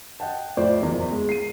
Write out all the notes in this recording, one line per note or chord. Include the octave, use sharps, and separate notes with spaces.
D#5 F#5 G5 A5
F2 A2 C5 D5
F#1 E2
G#3
C7 D#7